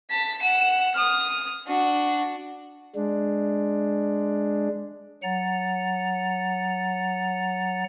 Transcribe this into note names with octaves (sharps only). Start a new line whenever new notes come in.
A5 B6
F#5 E7
D#6 F6
D4 F#4
G#3 D4
F#3 F#5 A#5 A6